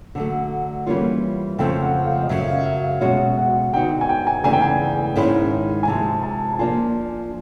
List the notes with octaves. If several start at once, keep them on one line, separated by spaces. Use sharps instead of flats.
D3 F#3 A3
E3 G3 A#3 C#4 F4
F2 C#3 F3 A3 C4 G5
F#5
F5
D#5
F#2 C#3 F#3 E5
F5
E5
F5
B2 G#3 C#4 F#4 F#5
F#5
D3 F#3 B3 D#4 F#4 G5
G#5
G5
G#5
E2 C#3 E3 A3 D4 G#5
G5
G#5
G#2 D#3 G#3 C#4 E4
G#5
C3 F3 G#3 A5
A5
A5
F3 A#3 D4 F4 G#5